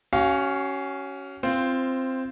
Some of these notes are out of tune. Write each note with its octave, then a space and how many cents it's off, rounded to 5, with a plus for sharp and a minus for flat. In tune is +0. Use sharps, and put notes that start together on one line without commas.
C#4 +0 F#4 +35 F5 -10
C4 +0 F4 -20 C5 +0